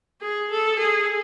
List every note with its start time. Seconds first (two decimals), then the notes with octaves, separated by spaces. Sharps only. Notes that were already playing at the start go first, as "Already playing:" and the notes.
0.21 G#4
0.51 A4
0.79 G#4